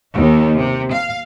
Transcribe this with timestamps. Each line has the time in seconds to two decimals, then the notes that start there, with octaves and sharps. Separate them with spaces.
0.13 D#2
0.58 C3
0.92 F5